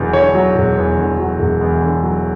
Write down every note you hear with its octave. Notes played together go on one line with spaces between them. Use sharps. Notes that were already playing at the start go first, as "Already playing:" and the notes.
Already playing: E1 E2 D3 F#3
D3 C#5
F#3
E1
E2
D3
F#3
E1
E2
D3
F#3